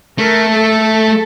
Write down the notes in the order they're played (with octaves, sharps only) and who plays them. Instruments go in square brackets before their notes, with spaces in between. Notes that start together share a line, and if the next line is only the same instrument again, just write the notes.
[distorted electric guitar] A3 [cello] A#4
[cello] A4
A4